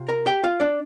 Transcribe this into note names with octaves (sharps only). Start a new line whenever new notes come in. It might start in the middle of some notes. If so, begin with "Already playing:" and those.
Already playing: C3 F4
A#4 A#5
G4 G5
F4 F5
D4 D5